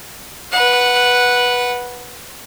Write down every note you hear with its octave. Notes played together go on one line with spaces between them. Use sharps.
B4 F#5